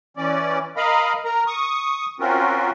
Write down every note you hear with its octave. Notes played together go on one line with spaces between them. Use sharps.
E3 C#4 D5
A#4 D#5 F5 A#5 B5
A#4 A#5
C#6 D#6
C4 C#4 F4 F#4 A#4